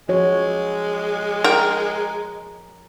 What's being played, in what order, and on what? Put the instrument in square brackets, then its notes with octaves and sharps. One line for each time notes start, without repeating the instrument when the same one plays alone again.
[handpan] F3 F#4 C#5 [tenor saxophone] G#3
[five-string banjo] A#4 G5